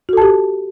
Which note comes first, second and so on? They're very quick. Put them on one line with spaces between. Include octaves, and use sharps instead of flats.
F#4 A4 A5 G4